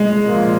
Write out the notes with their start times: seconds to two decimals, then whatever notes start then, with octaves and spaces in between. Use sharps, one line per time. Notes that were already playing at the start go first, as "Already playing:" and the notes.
Already playing: G#3
0.26 A#2 F3 A#3 F4